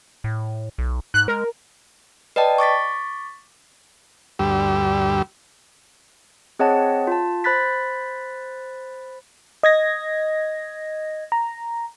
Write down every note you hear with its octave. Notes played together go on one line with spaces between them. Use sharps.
A2
B1
G#2 F#6
G#3 A#4
B4 D5 D#5 G5 A5
C#6 D6 A6 B6
D2 G2 G3 G4 E6
C4 G#4 C#5 D#5 F#5 A5
F4 A5
C5 B5 F#6 A6 B6
D#5 G#6 A#6
A#5